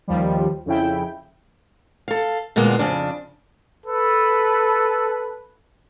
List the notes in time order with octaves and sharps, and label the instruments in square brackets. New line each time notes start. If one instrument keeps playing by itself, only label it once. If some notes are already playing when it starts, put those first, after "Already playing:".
[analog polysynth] D#2 F3 G3
F2 C#3 E4 G5
[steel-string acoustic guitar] A4 F5
A#2 D3 G#3 A#3 B3
F2 C#3 D4
[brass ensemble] A4 B4